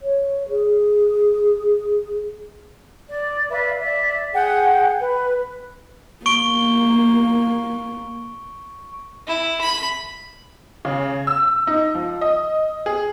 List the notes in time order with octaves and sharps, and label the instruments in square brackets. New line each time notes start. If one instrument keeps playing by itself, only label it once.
[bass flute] C#5
G#4
[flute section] D5
B4 D5 E5 F5
D5 E5
G#4 F#5 G5
B4
[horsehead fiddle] A#3 [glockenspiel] C#6 D7 G7
[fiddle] E4
B5
[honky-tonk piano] C#3
E6
D#4
F3
D#5
G#4